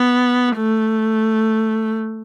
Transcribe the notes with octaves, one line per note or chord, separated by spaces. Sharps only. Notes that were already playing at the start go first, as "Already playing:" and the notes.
Already playing: B3
A3